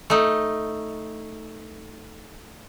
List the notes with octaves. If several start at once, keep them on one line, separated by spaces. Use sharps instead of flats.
A3 D#4